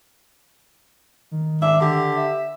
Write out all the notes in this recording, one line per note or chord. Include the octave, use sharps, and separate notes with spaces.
D#3
G#2 D4 E5
D3 G4
E5